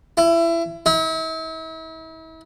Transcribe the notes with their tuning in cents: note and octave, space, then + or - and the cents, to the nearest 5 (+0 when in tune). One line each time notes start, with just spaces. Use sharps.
E4 +25
E4 -40